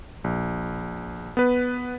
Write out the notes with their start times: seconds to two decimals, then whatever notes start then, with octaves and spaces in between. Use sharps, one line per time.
0.24 A#1
1.37 B3 B4